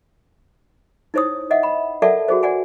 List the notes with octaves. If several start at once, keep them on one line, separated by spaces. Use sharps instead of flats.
D#4 E4 C5 C#5 D#6
D#5 E5 F#5
B5
A4 A#4 D5 E5 F#5 A5
F#4 G#4 C5
D5 F#5 G#5